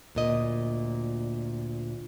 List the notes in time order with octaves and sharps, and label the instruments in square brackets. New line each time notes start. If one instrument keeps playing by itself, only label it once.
[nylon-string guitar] D2 A#2 D#5